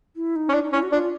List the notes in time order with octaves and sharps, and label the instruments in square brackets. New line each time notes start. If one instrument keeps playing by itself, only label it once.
[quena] E4
D#4
[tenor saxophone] C#4
[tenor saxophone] D4 [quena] E4
[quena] D#4
[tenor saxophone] C#4 [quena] E4
[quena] F#4
[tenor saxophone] D4 [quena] F4